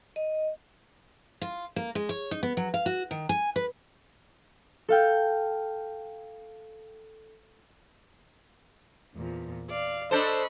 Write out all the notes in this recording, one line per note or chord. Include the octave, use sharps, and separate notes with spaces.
D#5
F4
A#3
G#3
C#5
D#4
B3
F#3
F5
F#4
D#3
G#5
B4
A4 F5 G5
E2 A#2 F3
D5 F5
D4 A4 C5 D#5 B5 C#6